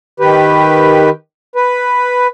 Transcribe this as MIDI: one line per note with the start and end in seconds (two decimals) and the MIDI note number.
0.20 1.09 51
0.20 1.09 67
0.20 1.09 71
1.56 2.27 71